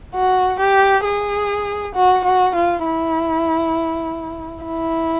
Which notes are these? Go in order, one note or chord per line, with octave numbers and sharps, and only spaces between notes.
F#4
G4
G#4
F#4
F#4
F4
E4
E4